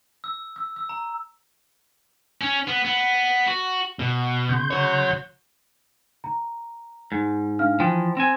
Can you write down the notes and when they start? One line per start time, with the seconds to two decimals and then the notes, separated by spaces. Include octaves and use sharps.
0.24 E6
0.56 E6
0.76 E6
0.89 A#5
2.41 C#4
2.68 B3
2.85 B3
3.47 F#4
3.99 B2
4.49 C#3 C6 G6
4.71 F#4 C#5
6.24 A#5
7.12 G#2
7.59 D4 F5 F6
7.80 E3 F3 G5
8.17 C4 G#5